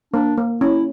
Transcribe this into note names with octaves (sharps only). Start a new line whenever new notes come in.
A#3 D4
A#3
C#4 E4